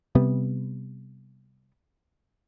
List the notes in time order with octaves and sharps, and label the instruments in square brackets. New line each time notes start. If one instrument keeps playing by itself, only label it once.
[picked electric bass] C3 G3 B3